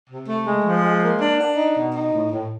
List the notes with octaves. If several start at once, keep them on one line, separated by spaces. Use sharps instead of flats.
C3
A3
G#3
F3
G#3
A#3
D4
D4
D#4
B2
D#4
A2
A2